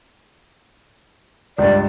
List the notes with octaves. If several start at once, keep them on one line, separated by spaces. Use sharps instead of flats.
C#2 G2 D5